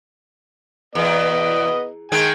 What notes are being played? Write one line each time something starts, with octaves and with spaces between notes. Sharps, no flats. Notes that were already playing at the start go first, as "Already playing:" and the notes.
E2 B3 D#5
D#3 G#3 G5 G#5